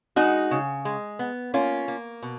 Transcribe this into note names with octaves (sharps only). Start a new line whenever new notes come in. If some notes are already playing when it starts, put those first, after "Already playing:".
G#3 D#4 F#4
C#3
G#3
B3
A#3 C#4 F4
A#3
B2